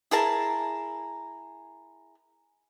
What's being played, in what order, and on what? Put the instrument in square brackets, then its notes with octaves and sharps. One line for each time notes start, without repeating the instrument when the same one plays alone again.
[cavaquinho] E4 G#4 A#4 A5